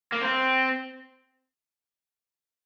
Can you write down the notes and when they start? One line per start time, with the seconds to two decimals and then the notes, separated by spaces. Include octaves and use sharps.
0.12 A#3
0.22 C4